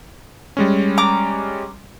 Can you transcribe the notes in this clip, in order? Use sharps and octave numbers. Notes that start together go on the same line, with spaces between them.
G3 G#3 C#4
A#5 D6